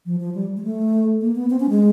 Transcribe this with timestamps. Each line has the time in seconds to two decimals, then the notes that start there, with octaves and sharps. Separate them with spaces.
0.06 F3
0.20 F3
0.35 G3
0.57 G#3
0.64 A3
1.21 A#3
1.36 B3
1.50 C4
1.60 C#4
1.70 G#3